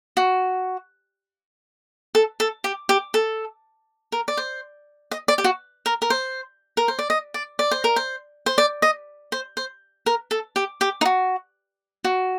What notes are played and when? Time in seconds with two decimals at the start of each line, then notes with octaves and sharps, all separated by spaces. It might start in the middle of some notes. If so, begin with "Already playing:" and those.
0.17 F#4
2.15 A4
2.40 A4
2.64 G4
2.89 G4
3.14 A4
4.12 A#4
4.28 D5
4.37 C5
5.11 D#5
5.28 D5
5.38 G4
5.44 F#4
5.86 A#4
6.02 A#4
6.10 C5
6.77 A#4
6.88 C5
6.99 D5
7.10 D#5
7.34 D5
7.59 D5
7.71 C5
7.84 A#4
7.96 C5
8.46 C5
8.58 D5
8.82 D#5
9.32 C5
9.57 C5
10.06 A#4
10.31 A4
10.56 G4
10.81 G4
11.01 D#4
11.05 F#4
12.04 F#4